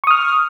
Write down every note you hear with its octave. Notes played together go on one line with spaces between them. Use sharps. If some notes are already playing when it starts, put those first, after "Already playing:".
C#6 D#6 F6